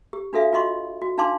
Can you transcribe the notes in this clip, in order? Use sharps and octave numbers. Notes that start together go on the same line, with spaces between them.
G4
D4 F#4 A4 E5 F5
F4 F#4 D#5 C6 C#6
F#4
D4 D#4 F5 A5 C6 D6